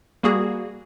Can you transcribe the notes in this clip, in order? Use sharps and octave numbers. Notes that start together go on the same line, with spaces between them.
G3 A#3 F#4 G#4